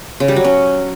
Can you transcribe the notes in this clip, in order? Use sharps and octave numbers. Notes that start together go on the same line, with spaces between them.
C#3
G3
F#3
C#4